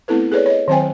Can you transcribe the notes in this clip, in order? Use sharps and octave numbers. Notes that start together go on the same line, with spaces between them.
A3 B3 C4 E4 A4 B4
G#4 A4 B4 C#5 D5
C#5 D#5
D#3 F#3 C4 C5 G5 G#5